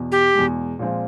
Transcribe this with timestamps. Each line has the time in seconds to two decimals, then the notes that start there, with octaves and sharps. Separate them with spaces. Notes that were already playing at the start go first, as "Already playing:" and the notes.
Already playing: E2 B2
0.12 G4
0.34 E2 B2 G#3
0.79 A#2 F3 G#3 C4 F4